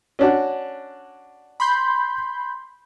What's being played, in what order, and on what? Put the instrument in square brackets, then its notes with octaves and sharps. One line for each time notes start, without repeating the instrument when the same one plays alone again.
[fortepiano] C#4 D4 F#4
[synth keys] B5 C6 G6